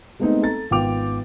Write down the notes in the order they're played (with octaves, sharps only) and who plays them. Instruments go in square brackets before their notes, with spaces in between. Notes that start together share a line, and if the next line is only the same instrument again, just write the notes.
[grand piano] G#3 A3 B3 C4 D#4
A4 A#5 A6
G#1 B3 F4 G5 D6 F7